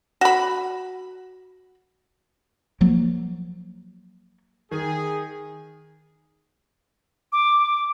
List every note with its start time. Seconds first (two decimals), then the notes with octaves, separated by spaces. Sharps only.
0.21 F#4 B5
2.81 F3 F#3 A#3
4.71 D#3 G#4
7.32 D6